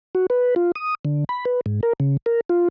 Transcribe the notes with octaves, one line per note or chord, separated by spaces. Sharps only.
F#4
B4
F4
D#6
D3
B5
B4
G#2
A#4
C#3
A#4
F4